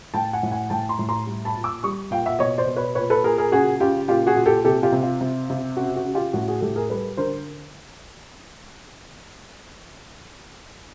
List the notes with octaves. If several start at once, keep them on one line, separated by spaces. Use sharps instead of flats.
A2 G5 A5
F#5 G#5
A2
F#5 G#5
A2 G5 A5
A#5 C6
A2
A#5 C6
G3
A5 B5
A#2
D6 E6
G3 C#6 D#6
A#2 F5 G5
E5 F#5
B2 C#5 D#5
C5 D5
B2
B4 C#5
A#2 B4 C#5
A4 B4
A#2 G#4 A#4
G#4 A#4
C#3 F#4 G#4
C#3 F4 G4
A#2 F4 G4
F#4 G#4
A#2
G4 A4
C3 G4 A4
F4 G4
C3
F4
C3
C3
C#3 F#4
F#4
C#3
F4 G4
A2 F#4
F#4 G#4
A2 G4 A4
G#4 A#4
G3 A4 B4
D3 A#4 C5